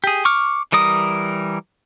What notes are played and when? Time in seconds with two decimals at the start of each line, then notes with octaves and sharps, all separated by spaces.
0.04 G4 G#4
0.25 C#6 D6 F6
0.72 E3 G3 A#4 D#6